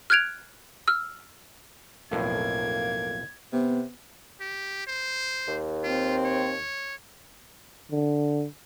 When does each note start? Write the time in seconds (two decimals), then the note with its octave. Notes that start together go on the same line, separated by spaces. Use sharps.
0.10 F6 F#6 G#6 D7 F7
0.88 E6 F6
2.12 B1 F2 A2 A#3 G#6
3.53 C3 B3
4.41 G4
4.87 C5
5.48 D#2
5.84 C4 F4
6.25 C#5
7.92 D3